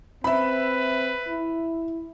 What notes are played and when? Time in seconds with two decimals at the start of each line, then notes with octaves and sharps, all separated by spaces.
0.24 C4 B4 E5 B5
1.28 E4